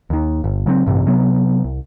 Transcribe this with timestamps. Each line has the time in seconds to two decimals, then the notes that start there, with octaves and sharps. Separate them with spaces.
0.10 D#2 D#3
0.44 G1
0.66 C#3 F#3 A#3 C4
0.87 A1 G2 C3
1.07 C3 F#3 B3
1.64 C2